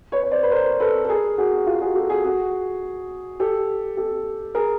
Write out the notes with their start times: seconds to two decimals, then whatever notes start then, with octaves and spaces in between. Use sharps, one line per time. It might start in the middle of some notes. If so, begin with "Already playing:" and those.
0.12 B4 C#5
0.23 C#5
0.31 C5 D5
0.43 B4
0.51 A#4 C5
0.80 A4 B4
1.05 A4
1.09 G#4 A#4
1.38 F#4 G#4
1.66 F4 G4
1.81 F#4 G#4
1.95 G4 A4
2.09 F#4 G#4
2.24 F#4 G#4
3.40 G4 A4
3.97 G4 A4
4.55 G#4 A#4